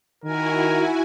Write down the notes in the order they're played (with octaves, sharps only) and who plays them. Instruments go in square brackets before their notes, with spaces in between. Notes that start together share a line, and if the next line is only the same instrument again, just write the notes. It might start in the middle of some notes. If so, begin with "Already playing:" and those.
[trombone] D#3 [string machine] E4 F#4 G#5 [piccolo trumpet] A#4